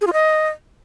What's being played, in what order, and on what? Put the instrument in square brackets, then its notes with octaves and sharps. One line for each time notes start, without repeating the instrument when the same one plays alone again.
[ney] G#4
F4
D#5